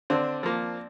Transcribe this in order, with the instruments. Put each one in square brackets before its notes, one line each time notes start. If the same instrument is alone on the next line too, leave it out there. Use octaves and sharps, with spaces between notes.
[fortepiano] D3 C4 D4
F3 A#3